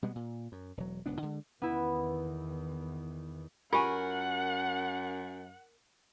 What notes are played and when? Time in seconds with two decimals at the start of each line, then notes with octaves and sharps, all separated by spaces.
0.02 B2 G3 G#3 B3
0.15 A#2
0.52 F#2
0.77 E1 F#3
1.06 D#1 C#2 B3 D4
1.22 D3 G#3
1.62 E2 D#3 B3 E4
3.73 F#2 F4 G4 A#4 F#5 G#5 C#6